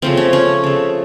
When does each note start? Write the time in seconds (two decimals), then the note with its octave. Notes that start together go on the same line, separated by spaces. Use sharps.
0.02 C#3 F3 A3 C4
0.17 C#4
0.33 C#4
0.64 C#3 A3